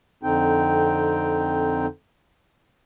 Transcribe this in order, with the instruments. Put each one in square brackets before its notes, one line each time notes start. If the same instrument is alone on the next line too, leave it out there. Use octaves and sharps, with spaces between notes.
[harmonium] F2 D3 C4 D#4 G5